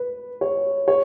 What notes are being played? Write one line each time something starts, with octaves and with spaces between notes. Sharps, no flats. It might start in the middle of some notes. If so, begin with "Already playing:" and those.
Already playing: B4
C#5
C#5